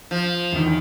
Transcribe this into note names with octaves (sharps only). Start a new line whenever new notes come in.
F3
E2 D#3